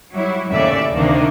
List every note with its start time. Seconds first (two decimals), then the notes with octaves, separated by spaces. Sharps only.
0.12 F#3 G3 E4
0.49 D#2 A2 C#3 D5 E5
0.93 D2 C3 D#3 A#3 D4 D5